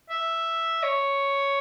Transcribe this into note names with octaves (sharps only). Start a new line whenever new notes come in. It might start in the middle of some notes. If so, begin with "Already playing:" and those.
E5
C#5